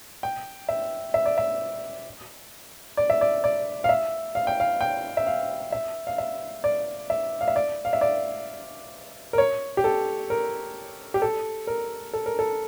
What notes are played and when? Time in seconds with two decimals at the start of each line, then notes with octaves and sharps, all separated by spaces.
0.23 G5
0.69 E5
1.14 E5
1.26 D5
1.38 E5
2.97 D5
3.10 E5
3.21 D5
3.44 D5
3.84 F5
3.89 E5
4.35 F5
4.47 G5
4.60 F5
4.81 G5
5.17 E5
5.27 F5
5.72 E5
6.07 F5
6.18 E5
6.64 D5
7.10 E5
7.41 F5
7.48 E5
7.56 D5
7.85 F5
7.93 E5
8.01 D5
9.33 A#4
9.38 C#5
9.77 G4
9.84 A4
10.30 A#4
11.14 G4
11.22 A4
11.67 A#4
12.13 A4
12.26 A#4
12.39 A4